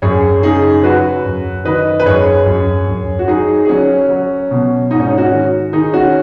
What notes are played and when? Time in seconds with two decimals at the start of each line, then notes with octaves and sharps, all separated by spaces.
0.02 F#2 G#4 C#5
0.43 C#3 D#4 G#4
0.83 F#3 F#4 B4
1.25 F#2
1.65 D#3 B4 D#5
2.00 B4
2.06 F#2 G#4 C#5
2.46 F#2
2.88 F#2
3.19 F#4
3.28 F#3 D#4 G#4
3.65 G#4
3.69 F#3 C#4 F#4
4.09 F#3
4.51 B2
4.91 G#2 D#4
5.00 C#4
5.09 D#4
5.18 C#4 F#4
5.31 D#3
5.73 D#3 D#4 G#4
5.93 C#4 F#4